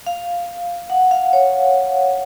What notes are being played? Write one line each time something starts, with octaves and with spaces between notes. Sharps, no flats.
F5
F#5
F5
C#5